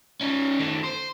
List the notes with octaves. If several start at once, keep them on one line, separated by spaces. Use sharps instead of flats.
C#4 D#4
D#3 A3
C5